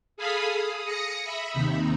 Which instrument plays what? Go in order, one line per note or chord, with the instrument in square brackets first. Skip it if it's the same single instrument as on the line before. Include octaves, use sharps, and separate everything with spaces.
[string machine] G#4 A4 F5 G#5 B5 D#6
G#4
D#6 A#6 C#7
E5 B5
D#2 C3 D#4